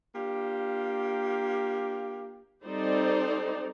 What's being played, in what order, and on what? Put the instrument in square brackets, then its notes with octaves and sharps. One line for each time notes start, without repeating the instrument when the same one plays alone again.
[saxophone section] A#3 D4 F4 G4
[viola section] G3 C4 D#4 A4 C5 D5